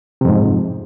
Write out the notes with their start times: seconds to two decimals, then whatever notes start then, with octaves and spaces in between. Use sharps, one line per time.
0.21 C3
0.25 F2
0.28 G#2